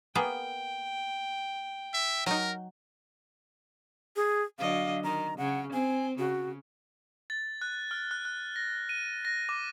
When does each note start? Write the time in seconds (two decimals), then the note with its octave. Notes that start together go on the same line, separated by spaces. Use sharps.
0.15 A#3 B3 G#4 G5
1.94 E5
2.26 F#3 D#4 A#4
4.16 G#4
4.59 D3 F#3 D#5 F5
5.04 D#3 A#5
5.38 C#3 F#5
5.73 C4 G#5
6.19 C#3 F#4
7.30 A6
7.62 F#6
7.91 F6
8.11 F#6
8.25 F#6
8.56 A#6
8.89 D#7
9.25 A#6
9.49 D6